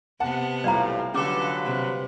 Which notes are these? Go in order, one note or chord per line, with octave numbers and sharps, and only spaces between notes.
C3 B3 F#5 A5
B1 E2 A2 G3 F4 D5 F5 A#5
D3 F#3 G#3 C#4 A4 B4 D6
C3